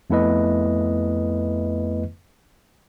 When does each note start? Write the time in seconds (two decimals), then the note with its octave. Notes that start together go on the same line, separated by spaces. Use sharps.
0.10 F2 A3 B3 E4 B4 D#5